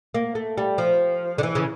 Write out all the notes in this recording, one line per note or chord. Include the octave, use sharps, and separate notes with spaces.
A#3
A3
G3
F3
D3
E3
C#3